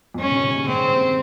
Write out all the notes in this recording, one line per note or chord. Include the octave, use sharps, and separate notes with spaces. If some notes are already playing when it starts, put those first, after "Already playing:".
F2
G2 C#4
C3 D#3
C3 D#3
A#2 C#3
G#2 C3 C4
A#2
G#2 C3